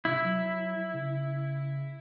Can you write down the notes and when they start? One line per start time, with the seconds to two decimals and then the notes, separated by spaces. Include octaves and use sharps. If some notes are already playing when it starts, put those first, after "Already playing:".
0.05 C3 E4
0.24 F#3
0.93 C#3